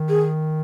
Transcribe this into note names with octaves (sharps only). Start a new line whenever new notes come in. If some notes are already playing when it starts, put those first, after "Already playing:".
Already playing: D#3
G#4